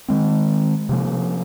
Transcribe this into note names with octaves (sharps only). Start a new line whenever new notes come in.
D#3 G#3 C4
C3 F3 A#3